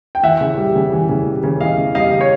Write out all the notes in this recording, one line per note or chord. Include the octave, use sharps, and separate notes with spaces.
G5
E3 E5 F#5
C#3
G3
C#3
E3
C#3
G3
C#3
E3 D#5 F5
C#3
G3 D#5 F5
C#3
C#5